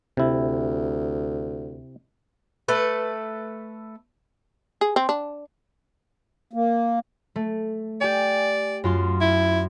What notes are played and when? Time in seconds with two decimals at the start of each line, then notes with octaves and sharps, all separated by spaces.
0.17 D2 C3 E4
2.68 A3 A4 B4
4.81 G#4
4.96 C4
5.09 D4
6.53 A#3
7.36 A3
8.01 G4 D5 G#5
8.84 F#2 F4 C6
9.21 E4